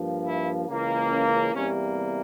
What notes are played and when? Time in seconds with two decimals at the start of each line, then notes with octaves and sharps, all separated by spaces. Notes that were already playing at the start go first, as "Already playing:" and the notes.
Already playing: G2 F3 A#3
0.27 E4
0.68 C#2 C#3 E3 A#3
1.10 C#4
1.54 E2 C3 G3 A#3 C#4